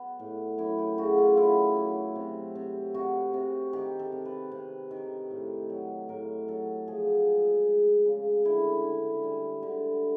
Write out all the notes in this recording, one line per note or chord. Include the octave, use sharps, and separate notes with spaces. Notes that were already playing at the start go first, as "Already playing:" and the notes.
Already playing: F#3 B3
A2
F#2 E4
G4
C#3 F#4
F4
F#3 E4
F#3
C3
C3
C3 F#4
C3
D#3 G4
A4
C3
B4
C3
D#3
A2
F#3
A2 A#4
F#3 A4
F3 G#4
G#3
G#3
C#3
D3 E4
D3
G3
D3